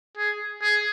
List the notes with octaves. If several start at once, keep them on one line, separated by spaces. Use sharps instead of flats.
G#4
G#4